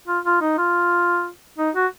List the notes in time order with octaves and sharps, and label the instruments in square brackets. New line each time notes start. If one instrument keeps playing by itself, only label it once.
[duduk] F4
F4
D#4
F4
D#4
F#4